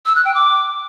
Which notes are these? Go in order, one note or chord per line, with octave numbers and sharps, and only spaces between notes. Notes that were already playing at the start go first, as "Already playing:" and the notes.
E6
F#6
G5
D6